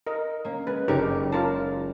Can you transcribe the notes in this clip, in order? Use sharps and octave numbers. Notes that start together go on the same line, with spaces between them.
A#4 D#5
A#3 C#4
G#3 B4
F#1 D#4 G4 A#4 C#5 D6
F4 A#4 A5